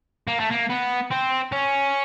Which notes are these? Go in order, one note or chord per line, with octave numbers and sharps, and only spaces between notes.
A#3
A3
A#3
B3
C4
C#4